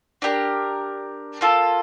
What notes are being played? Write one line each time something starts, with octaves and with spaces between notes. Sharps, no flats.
D4 G4 A#4
A#3 F4 A4